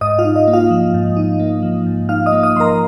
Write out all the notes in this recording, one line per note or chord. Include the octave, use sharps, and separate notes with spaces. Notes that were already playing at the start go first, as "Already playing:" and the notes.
G#2 D#5 D#6
F4 F5
D#4
D#5
A#3
F4 F5
F3
G#2
D#4
A#3
F3
G#2
D#4 F5 F6
D#5 D#6
A#3
D#5 D#6
F3 A#4 A#5 C6